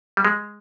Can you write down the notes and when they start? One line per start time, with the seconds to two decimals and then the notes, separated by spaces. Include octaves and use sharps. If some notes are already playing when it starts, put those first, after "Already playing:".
0.17 G3
0.25 G#3